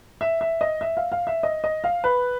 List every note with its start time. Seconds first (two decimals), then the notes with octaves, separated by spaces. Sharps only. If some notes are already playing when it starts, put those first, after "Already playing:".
0.21 E5
0.41 E5
0.61 D#5
0.81 E5
0.97 F5
1.12 F5
1.27 E5
1.43 D#5
1.64 D#5
1.84 F5
2.04 B4